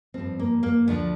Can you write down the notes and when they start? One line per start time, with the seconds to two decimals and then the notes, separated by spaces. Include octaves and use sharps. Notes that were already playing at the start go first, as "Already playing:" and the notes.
0.14 G2 F3 C4
0.39 A#3
0.63 A#3
0.88 D2 D3 F3 A3